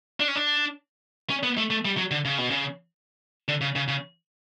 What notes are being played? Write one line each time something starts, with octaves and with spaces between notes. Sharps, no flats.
D4
C#4
D4
C#4
B3
A3
A3
G3
F#3
D3
C#3
B2
C#3
D3
C#3
C#3
C#3